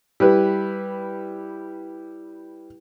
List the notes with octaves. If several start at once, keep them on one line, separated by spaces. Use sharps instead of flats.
G3 E4 B4